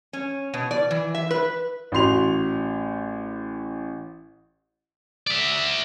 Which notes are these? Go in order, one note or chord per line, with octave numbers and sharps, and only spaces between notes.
C#4
B2
D5
E3
E5
B4
A1 F#4 C6 F7
D5 E5